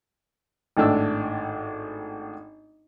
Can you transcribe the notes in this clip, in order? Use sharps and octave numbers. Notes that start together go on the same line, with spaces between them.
G#1 A2 D4 E6